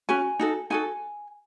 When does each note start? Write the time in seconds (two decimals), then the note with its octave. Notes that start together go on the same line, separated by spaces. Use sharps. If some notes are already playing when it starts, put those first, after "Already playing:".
0.09 C#4 F#4 G#5
0.39 D#4 F#4 A4
0.70 D#4 F#4 A4 G#5